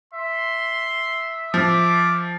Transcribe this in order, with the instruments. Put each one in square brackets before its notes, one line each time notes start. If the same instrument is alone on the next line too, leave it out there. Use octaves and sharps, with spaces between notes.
[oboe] E5 [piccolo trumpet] C6
[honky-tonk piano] F3 [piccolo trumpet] D6